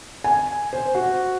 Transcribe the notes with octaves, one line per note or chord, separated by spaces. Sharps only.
G#5
C5
F#4